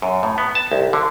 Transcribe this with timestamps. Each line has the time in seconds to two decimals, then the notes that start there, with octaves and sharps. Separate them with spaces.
0.02 F#2
0.23 A2
0.38 B3
0.55 A5
0.72 C2
0.93 D3